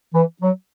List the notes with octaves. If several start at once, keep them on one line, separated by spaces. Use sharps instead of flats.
E3
F#3